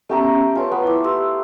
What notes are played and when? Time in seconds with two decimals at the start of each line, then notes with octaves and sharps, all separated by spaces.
0.09 A3 B3 C#4 G4 A#5
0.56 F4 A4 B4 C#5 G#5
0.72 B3 A4
0.83 E4 D6
1.04 G4 C6 E6